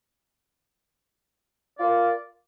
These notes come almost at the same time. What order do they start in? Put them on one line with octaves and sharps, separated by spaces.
D5 F4 A#4